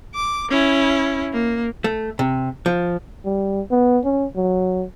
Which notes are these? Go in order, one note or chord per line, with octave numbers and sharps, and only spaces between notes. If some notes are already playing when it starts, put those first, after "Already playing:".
D6
C#4 E4
A#3
A3
C3
F3
G3
B3
C#4
F#3